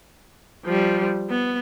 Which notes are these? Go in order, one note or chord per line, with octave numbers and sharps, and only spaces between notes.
F3 G3
B3